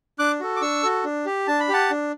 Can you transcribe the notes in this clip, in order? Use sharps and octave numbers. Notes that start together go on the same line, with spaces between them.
D4 D6 F#6
F#4 A4
D6
D4 C#6 E6
F#4 A4
D4
G4
D4 A5
B5
G4 F#5 A5
D4